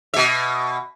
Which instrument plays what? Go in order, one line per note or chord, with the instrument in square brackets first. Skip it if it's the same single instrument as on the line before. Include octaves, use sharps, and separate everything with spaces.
[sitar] B2 E5